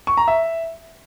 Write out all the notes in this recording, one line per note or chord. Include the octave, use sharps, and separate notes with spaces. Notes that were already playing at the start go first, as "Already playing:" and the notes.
C#6
A#5
E5